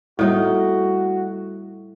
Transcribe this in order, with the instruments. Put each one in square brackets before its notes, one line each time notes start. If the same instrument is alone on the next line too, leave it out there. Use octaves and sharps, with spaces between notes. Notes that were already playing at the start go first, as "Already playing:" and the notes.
[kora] A2 D#4 [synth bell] G3 A4 [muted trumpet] F#4